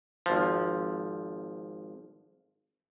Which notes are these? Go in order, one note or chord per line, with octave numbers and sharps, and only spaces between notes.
G#1 F3